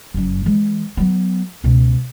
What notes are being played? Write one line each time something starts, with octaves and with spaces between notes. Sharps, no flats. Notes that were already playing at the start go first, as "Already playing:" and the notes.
F#1 F#2
E3 G#3
F#3 B3
C#2 B2